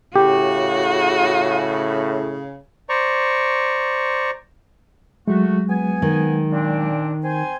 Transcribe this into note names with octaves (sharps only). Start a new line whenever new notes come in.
A2 C#3 F#4 G4
C5 D5 A#5 C#6
F#3 G#3 A3 F#4
B3 G#5
D#3
A#2 C4 D4
C4 C5 G#5